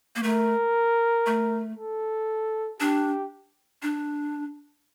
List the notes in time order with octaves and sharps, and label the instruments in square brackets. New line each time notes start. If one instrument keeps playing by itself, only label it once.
[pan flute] A#3
[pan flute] A3 [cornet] A#4
[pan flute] A3
[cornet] A4
[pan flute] D4 [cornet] G4
[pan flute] D4